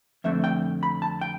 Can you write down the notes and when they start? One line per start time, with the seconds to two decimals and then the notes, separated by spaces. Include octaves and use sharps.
0.24 F2 D3 A3 C4 E5
0.44 G5
0.83 B5
1.02 A5
1.21 G5